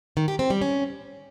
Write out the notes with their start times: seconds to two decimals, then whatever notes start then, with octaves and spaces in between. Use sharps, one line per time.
0.17 D#3
0.28 G4
0.39 C4
0.50 G3
0.61 C#4